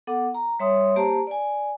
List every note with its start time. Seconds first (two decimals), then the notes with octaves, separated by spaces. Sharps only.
0.07 B3 A4 F#5 D6
0.34 A#5
0.60 G3 C#5 E5 C6 D#6
0.96 A#3 G4 C5 A5 A#5
1.27 D5 G#5